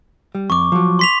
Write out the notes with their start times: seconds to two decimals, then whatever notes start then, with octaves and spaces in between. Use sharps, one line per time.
0.35 G3
0.50 F2 C#6 D6
0.72 F3 F#3
0.99 C6 B6 F7